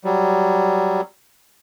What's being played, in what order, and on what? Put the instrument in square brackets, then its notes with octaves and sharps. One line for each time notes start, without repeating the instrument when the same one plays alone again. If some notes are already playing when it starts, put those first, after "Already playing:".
[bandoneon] F#3 G3